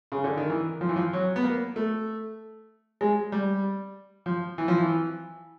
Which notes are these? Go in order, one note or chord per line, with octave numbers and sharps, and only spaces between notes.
C#3
D3
D#3
E3
F3
E3
F3
F#3
B3
A#3
A3
G#3
G3
F3
E3
F3
E3